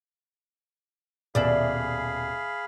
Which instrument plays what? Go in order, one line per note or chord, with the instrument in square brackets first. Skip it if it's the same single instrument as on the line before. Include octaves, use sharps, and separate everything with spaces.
[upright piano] D#1 B2 F#7 [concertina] G#4 F5 B5 [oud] D5 E5